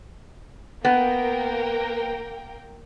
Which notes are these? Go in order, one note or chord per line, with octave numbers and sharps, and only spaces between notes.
A#3 B3 A#4 G5